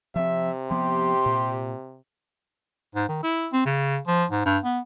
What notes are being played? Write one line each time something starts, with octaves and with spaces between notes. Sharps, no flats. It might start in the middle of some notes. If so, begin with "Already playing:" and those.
C3 F3 C4 E5
F3 B3 G4 C6
A#2
G#2
D#3
E4
C4
C#3
F3
G#2
G2
B3